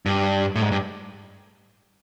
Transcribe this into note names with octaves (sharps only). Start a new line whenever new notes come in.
G2
A2
G#2
G2